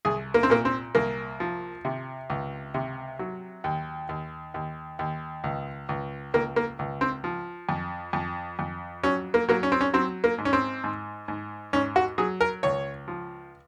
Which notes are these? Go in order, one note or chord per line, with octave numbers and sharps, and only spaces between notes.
C2 G#4
A#3
C4
A#2 A#3
C4
C2 A#3
F3
C3
C#2
C3
F#3
D#2
D#2
D#2
D#2
C#2
C#2
C#2 A#3
A#3
C#2
C4
F3
F2
F2
F2
F#3 C#4
A#3
F#3 A#3
C#4
C4
C#4
F#3 C4
A#3
G#2
C#4
C4
G#2
G#2
G#2 C#4
F#4
F#3 G#4
A#4
C#2 C#5
F3